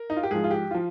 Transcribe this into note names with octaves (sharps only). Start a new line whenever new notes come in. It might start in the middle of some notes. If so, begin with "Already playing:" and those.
Already playing: A#4
D#4
F4
G4
G#2 F3 G#4
F4
G4
F3 F4